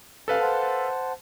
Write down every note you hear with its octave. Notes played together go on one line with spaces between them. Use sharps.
C3 C#4 A4 B4 F5
C5 F#5 A5